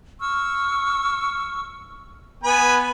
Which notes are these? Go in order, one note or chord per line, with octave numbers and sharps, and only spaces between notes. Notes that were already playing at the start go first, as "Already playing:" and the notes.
C#6 E6 F6
B3 B4 G#5 B5